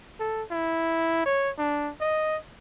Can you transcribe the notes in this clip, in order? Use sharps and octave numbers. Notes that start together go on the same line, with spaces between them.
A4
E4
C#5
D4
D#5